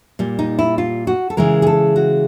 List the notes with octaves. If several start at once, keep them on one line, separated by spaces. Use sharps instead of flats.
A#2 G3
D#4
E4
F4
F#4
A4
C#3 E3 G#3 A#4
G#4
A4
F#4